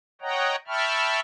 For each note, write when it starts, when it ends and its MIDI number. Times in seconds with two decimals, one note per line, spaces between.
0.21 0.56 73
0.21 0.56 75
0.21 0.56 78
0.21 0.56 79
0.21 0.56 82
0.67 1.20 76
0.67 1.20 79
0.67 1.20 81
0.67 1.20 83
0.67 1.20 85
0.67 1.20 89